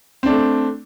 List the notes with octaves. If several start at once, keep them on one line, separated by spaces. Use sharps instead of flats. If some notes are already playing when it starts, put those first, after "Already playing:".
A3 C4 D4